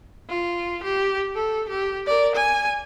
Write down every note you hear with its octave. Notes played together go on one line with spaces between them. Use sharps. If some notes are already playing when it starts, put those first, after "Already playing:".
F4
G4
A4
G4
A#4 D5
G#5